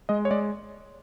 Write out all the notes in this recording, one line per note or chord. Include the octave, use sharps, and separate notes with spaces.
G#3 D#5
C#5
G#3 D5